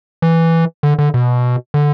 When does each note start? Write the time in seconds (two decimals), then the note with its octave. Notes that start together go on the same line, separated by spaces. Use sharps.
0.22 E3
0.83 D3
0.99 D3
1.14 B2
1.74 D3